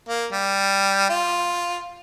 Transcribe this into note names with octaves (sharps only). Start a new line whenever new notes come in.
A#3
G3
F4